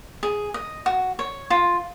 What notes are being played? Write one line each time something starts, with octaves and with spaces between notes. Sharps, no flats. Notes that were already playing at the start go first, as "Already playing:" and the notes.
G#4
D#5
F#4
C#5
F4